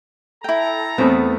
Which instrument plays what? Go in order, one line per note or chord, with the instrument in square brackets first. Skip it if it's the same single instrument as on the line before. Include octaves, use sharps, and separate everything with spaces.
[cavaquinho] E4 G5 [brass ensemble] A4 A#5
[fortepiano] E2 A3 B3 [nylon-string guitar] C4